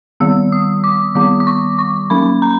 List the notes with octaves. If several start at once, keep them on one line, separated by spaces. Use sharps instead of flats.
D#3 G3 B3 E6
D#6
D6
D#3 G3 B3 D6
D6
C#6
C#6
F#3 A#3 C#4 B5
A#5